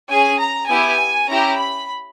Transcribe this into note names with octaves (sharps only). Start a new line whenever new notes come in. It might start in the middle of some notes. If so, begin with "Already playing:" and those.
C#4 G#4 G#5
A#5
B3 E4 G4 G#5
C#4 E4 G4 A#5
B5